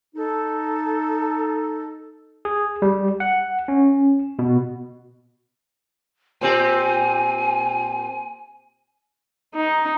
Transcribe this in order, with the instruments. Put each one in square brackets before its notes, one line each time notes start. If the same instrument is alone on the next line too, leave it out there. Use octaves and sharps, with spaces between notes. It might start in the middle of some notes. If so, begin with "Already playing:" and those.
[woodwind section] D#4 A4
[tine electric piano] G#4
G3
F#5
C#4
B2
[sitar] A#2 C4 G4 [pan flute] G#5
[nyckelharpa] D#4